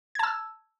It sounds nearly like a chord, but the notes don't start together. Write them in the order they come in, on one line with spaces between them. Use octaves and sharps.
G#6 A5 E6